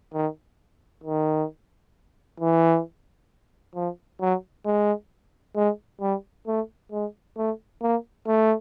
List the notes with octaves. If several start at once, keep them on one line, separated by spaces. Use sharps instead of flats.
D#3
D#3
E3
F3
F#3
G#3
G#3
G3
A3
G#3
A3
A#3
A3